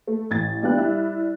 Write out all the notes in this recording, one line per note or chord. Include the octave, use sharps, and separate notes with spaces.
A3
A1 G#6 A6
G3 B3 D4 F4 G5 F#6
G3 E4